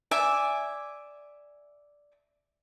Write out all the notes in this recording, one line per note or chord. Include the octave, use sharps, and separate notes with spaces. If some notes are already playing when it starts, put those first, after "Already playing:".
D5 E5 G#5 D6